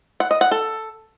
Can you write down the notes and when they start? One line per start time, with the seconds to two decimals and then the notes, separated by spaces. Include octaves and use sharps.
0.20 F#5
0.31 D#5
0.41 F#5
0.51 A4